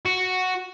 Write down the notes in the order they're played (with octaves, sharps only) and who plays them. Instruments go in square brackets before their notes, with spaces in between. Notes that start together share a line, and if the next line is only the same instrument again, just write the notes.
[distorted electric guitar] F#4